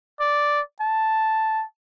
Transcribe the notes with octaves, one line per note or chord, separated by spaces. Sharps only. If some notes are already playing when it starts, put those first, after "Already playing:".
D5
A5